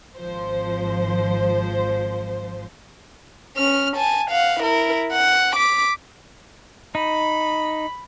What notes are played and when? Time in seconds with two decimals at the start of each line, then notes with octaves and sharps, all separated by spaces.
0.17 G#1 F3 C5
3.57 C#4 F6
3.96 G#5 A5
4.30 F5 F#5
4.60 E4 A#4
5.13 F#5
5.56 D6 B6
6.95 D#4 B5